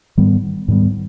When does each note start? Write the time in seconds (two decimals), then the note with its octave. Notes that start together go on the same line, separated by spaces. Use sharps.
0.17 G#2 D#3 G3 B3
0.68 G#2 D#3 G3 B3